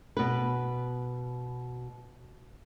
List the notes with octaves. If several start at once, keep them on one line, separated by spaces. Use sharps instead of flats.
B2 B4